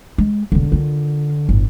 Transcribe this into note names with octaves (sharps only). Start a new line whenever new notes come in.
G#3
E1 C#2 D3
D#3 F4
G1 A2